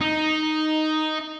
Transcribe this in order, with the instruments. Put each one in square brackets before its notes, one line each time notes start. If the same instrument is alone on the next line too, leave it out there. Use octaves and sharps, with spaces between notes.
[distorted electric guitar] D#4